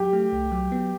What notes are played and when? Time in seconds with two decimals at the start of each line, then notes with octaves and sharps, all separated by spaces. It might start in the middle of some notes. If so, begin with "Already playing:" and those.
Already playing: F#3 G4
0.13 A3
0.32 C2
0.52 F#3
0.72 B3